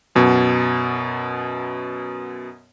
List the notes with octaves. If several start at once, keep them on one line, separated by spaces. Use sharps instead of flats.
F#2 B2